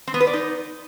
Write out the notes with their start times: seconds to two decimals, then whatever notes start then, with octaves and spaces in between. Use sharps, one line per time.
0.08 C4
0.14 B3
0.20 B4
0.27 D5
0.33 D#4